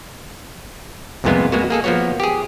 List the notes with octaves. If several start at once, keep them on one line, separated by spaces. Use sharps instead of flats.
C2 F2 A#2 G#3 B3 F4
G#3 A#3 B3 F#4
A#3 G#4 A4
F3 A#3 B3 F#4 C#5
G4 G#4